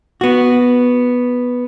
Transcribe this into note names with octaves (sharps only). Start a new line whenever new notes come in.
B3 F#4